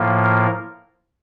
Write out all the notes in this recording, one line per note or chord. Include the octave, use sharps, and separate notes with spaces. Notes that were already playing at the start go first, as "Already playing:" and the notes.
Already playing: A2 F3 A#3
A#4